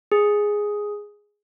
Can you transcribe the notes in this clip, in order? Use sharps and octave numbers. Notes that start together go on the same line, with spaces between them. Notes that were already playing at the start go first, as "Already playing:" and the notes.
G#4